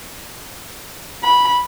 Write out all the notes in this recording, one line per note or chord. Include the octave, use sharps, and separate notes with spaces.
B5